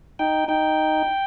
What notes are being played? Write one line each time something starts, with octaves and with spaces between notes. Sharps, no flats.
D#4 G5
D#4 G5